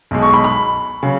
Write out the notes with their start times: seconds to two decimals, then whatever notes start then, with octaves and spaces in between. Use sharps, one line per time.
0.11 B1 B2 G#3
0.22 C#6
0.34 B5
0.44 B5
1.03 C#3 F#3